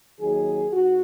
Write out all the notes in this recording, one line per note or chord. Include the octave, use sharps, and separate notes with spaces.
D#2 D#3 F#3 G#4
G#2 F#4